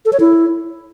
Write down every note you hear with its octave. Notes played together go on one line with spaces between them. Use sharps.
A4
C#5
E4